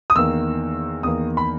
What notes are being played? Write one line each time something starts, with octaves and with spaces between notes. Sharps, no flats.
D#6
E2 D#3 A#3 E6
E2 D#3 A#3 D#6
B5